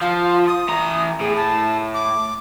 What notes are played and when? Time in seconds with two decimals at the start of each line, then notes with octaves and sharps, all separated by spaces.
0.01 F3 F5
0.47 D#6
0.69 E3 A#5
1.21 A2 G#4
1.37 A5
1.94 D6